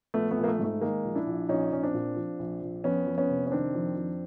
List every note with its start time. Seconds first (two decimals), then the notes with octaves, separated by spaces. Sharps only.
0.14 A#1 A3 B3
0.31 A3 B3
0.37 A#1
0.44 A#3
0.48 A3
0.59 G#2 A3
0.81 D#3 G#3 A#3
1.04 A#1
1.15 D4 E4
1.26 A#1
1.49 A#1 C#4 D#4
1.71 A#1 C#4
1.83 C4 D4
1.94 A#2
2.17 F3
2.39 A#1
2.62 A#1
2.84 F2 B3 C#4
3.07 F2
3.18 B3 C#4
3.30 C3
3.47 C#4
3.52 D#3 C4 D4
3.75 F2
3.96 F2